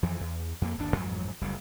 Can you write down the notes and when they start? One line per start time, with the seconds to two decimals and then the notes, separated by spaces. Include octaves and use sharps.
0.03 F2 E3 F3
0.20 E2
0.62 F2 A#3
0.78 G1 D#2 D4
0.96 A1 F2 G#2 F#3
1.41 F#1 D2 G3